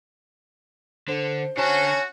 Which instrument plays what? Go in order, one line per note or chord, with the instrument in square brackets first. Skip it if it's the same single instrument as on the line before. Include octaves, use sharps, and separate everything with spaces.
[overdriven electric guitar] D3 [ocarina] C5
[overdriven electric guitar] D3 A5 [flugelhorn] C#4 [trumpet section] F#4